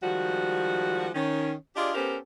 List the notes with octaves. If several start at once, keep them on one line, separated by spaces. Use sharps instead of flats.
D#3 F3 G3 G#3 F#4
D#3 C#4
D4 F4 G4 G#4 D5 D#5
B3 C#4 G4 A4 A#4 C5